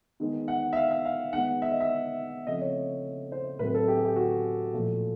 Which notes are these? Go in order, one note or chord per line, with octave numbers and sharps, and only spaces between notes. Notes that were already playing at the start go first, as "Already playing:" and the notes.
D#3 G#3 B3
F#5
E5
F5
E5
F5
D#3 G#3 B3 F#5
E5
D#5
E5
C#3 F3 A3 C4 D#5
C#5
C5
A2 F#3 A3 C4 B4
A4
G4
G#4
G4
F#4
A#2 F3 A3